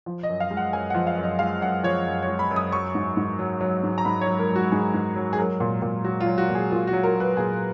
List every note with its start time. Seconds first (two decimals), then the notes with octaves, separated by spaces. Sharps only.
0.06 F3
0.23 D#5
0.29 F#2
0.40 F5
0.51 G#3
0.57 F#5
0.73 F#2 G#5
0.90 F3 F#5
1.07 F5
1.17 F#2
1.23 D#5
1.39 G#3 F5
1.61 F#2 F#5
1.83 F3 C#5
2.06 F#2
2.22 C#5
2.28 G#3
2.39 B5
2.51 F#2
2.56 D#6
2.72 F#3 C#6
2.95 G#2
3.17 G#2
3.39 F#3
3.61 F#3
3.84 G#2
3.98 A#5
4.05 G#2 B5
4.21 C#5
4.27 F#3
4.39 A#4
4.50 F#3
4.56 F#4
4.72 G#2 G#4
4.94 G#2
5.16 F#3
5.33 G#4
5.38 F#3 A#4
5.60 A#2
5.82 A#2
6.04 F#3 F#4
6.20 F4
6.26 F#3
6.38 F#4
6.49 A#2
6.55 G#4
6.71 A#2 F4
6.87 F#4
6.93 F#3
7.03 A#4
7.15 F#3
7.20 B4
7.37 A#2 G#4